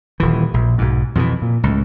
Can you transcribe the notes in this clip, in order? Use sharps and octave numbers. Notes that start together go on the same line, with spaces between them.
D#1 E3
A#1
B1 G#2
F2 B2 D3 E3
A#2
C#2 A2